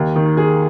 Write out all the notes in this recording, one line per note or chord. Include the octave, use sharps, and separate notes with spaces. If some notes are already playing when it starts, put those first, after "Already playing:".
Already playing: D#2
D#3
G#4